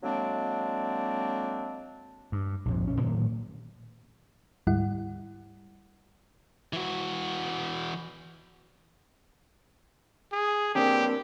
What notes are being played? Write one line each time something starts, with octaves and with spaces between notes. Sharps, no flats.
D3 F#3 G#3 A#3 C4 D4
G2
A#1 F2 G#2
A#1 C#4
A2 D#3 F#3 A3
D2 G#2 G3 E4 F#5
E3 F#4
G#4
A#3 C4 D4 G4